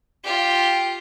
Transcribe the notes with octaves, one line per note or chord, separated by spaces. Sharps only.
F4 G4